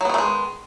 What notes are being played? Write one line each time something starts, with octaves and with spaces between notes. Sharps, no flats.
D#3 F#3 G#3 A3 B3